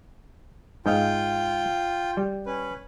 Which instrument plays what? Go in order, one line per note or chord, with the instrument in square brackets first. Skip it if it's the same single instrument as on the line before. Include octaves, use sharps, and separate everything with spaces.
[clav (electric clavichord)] G#2 D#5 F5 [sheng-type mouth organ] F4 G5
[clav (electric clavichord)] G3
[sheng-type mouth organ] C#4 B4